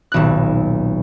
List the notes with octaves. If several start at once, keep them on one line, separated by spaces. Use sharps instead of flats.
D#1 B1 F#6